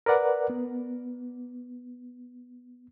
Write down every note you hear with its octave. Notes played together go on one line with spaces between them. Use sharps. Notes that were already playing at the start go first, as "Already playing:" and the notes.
A#4 B4 D5 F#5
B3